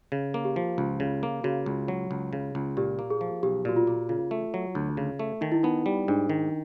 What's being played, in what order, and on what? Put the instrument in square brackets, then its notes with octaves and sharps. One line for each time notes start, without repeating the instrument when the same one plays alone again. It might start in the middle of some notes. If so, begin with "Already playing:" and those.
[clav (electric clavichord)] C#3
A#3
[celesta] G4
[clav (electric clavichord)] F3
C#2
C#3
A#3
[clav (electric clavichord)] C#3 [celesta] F#4
[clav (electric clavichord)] C#2
F#3
C#2
C#3
C#2
[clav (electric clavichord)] A#2 [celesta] G4
[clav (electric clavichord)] A#3
[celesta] G#4
[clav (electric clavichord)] F3
[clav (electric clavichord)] B1 [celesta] G4
[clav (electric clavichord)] A#2 [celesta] F#4
[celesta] F4
[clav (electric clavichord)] A#3
[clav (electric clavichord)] C#3 [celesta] F4
[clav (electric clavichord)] A3
F#3
D2
C#3
A3
[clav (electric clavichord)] D#3 [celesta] D#4
[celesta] E4
[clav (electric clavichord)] B3 [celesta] D#4
[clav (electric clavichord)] G3
[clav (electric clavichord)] G#2 [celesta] D4
[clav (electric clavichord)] D#3